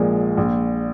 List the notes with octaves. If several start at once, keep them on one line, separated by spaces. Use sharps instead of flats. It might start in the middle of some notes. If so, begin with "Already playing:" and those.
Already playing: A#1 A#2 F3 G#3
A#1